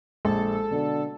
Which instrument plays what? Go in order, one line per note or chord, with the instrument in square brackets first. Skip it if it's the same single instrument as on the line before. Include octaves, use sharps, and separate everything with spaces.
[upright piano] A#1 [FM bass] G#3 [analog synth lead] A4
[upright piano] B2 [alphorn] D3